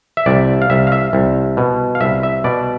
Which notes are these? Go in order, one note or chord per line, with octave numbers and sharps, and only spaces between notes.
E5
C2 D5
F5
C2 E5
F5
E5
C2
B2
F5
C2 E5
E5
B2 D5